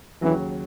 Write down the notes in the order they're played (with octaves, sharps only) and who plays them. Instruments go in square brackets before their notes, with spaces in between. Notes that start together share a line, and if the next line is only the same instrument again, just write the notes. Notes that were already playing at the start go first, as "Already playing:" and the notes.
[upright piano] D#2 C#3 F#3 [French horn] E3